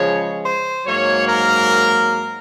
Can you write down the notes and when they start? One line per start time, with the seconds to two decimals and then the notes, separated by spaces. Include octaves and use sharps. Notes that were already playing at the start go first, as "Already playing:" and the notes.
Already playing: C#3 F3 G#3 C#5
0.44 C5
0.86 G#2 F#3 A#3 C#5
1.28 A#4